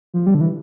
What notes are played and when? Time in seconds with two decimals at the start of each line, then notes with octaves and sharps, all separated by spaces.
0.14 F3
0.26 G3
0.34 D3
0.41 E3